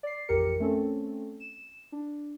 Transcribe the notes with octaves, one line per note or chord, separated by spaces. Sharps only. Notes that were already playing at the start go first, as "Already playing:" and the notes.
D5 C7
A1 F2 G4 A#4 C#7
A3 C4 C#4 A4
E7
D4